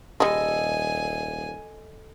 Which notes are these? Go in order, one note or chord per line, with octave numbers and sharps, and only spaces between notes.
D#1 G3 G#3 A4 D#5 G#5